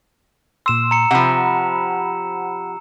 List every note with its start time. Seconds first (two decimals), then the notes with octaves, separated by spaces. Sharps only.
0.66 A#2 C6 E6 E7
0.91 A#5 C#7
1.11 C3 F3 F#5 B5